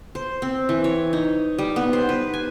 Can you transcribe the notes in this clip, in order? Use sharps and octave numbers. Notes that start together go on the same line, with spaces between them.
C5
C4
E3
C#5
D#4
G3
B3
C5
B4
G#5